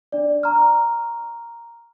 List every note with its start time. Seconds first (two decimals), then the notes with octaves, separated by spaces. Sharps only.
0.12 D4 D5
0.43 A#5 C6 C#6 F6